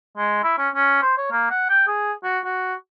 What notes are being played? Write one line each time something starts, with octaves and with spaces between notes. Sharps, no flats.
G#3
E4
C#4
C#4
C5
C#5
A#3
F#5
G5
G#4
F#4
F#4